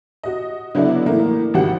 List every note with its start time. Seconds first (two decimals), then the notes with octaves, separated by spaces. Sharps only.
0.23 F#4 D#5
0.75 D3 F#3 B3 D4 E4 D5
1.06 A2 E3 A3 A#3
1.54 G#1 G3 F#4 G4 F#5